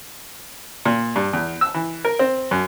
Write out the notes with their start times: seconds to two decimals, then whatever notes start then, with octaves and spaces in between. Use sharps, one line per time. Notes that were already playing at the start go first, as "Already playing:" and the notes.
0.85 A#2
1.16 G2
1.33 E2
1.61 E6
1.74 E3
2.05 A#4
2.19 C4
2.51 F#2